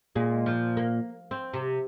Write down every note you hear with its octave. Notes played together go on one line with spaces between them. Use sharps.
A#2 G#3
F3
A#3
C4
C3